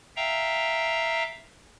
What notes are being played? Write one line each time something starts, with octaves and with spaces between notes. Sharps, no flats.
E5 F5 G5 A#5